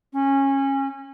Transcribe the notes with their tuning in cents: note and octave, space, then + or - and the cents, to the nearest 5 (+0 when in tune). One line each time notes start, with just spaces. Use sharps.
C#4 -20